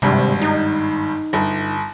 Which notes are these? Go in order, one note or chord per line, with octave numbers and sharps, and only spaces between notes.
G#1 G2 C3
D#4
G1